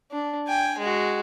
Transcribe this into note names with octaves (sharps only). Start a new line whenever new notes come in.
D4
G5 G#5
G#3 F#4